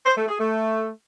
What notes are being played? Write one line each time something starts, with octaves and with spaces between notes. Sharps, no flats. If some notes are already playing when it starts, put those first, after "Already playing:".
C5
A3
G#4
A3